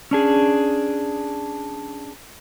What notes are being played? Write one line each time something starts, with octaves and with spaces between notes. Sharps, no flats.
C#4 D4 G#4